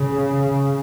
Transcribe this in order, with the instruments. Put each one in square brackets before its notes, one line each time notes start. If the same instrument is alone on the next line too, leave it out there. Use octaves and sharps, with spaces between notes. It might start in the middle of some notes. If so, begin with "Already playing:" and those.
Already playing: [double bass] C#3